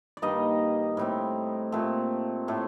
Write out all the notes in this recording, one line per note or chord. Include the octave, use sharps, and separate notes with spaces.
D5
G2 D#3 G3 A#3 D#4 D#5
A2 G3 C4
A#2 A3 C4
A2 A3 C4